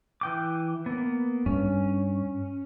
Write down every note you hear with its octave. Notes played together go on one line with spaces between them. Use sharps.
E3 G5 D6
A#3 B3
G2 C#4